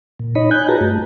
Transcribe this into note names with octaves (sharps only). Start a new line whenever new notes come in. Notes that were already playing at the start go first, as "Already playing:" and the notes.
A#2
D#4 C#5 D#5 B5
G#5 F#6 G6
F4 F#4 G#4 B4 A5 A#5
G2 A3